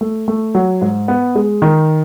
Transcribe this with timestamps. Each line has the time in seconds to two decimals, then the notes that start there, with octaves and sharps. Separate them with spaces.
0.01 A3
0.28 A3
0.55 F#3
0.81 G#2
1.08 B3
1.35 G#3
1.62 D#3